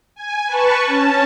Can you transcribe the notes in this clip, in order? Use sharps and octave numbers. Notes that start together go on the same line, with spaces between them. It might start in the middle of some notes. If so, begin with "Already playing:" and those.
G#5
B4 A5 C#6
C#4 A5